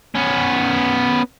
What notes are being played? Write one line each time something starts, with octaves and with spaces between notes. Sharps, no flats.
B3 C#4